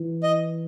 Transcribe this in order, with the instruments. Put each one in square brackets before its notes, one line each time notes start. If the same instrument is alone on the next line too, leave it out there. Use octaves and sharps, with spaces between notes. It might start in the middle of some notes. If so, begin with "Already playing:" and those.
Already playing: [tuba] E3
[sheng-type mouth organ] D#5